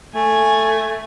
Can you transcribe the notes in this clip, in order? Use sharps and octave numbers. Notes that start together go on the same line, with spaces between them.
A3 G#5